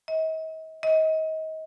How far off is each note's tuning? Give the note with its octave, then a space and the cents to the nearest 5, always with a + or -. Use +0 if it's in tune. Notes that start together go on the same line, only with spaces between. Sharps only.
D#5 +40
D#5 +30